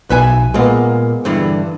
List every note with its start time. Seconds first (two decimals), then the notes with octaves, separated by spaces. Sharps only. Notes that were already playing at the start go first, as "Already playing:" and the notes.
0.10 B1 B4 E5 G#5
0.54 A#2 G#3 A#3 B3
1.25 G2 D3 E3